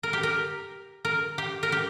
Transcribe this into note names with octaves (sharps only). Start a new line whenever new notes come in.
A#4
G4
A#4
A#4
G4
A#4
G4